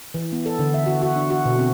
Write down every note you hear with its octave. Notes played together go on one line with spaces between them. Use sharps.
E3
B3
A4
D3
E5
F#4
F#4
D4
F#4
B2
C4